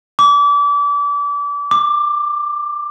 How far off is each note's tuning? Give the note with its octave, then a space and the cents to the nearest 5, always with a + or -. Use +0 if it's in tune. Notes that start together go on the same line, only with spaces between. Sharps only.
D6 -30
D6 +15